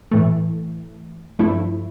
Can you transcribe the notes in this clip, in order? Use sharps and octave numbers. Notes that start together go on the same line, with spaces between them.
A2 E3 A3
G2 F3 A3 E4